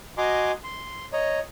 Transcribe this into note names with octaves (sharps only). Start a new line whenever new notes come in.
F#4 D#5 G#5 A#5 C6 D6
C6
C#5 D#5 A#5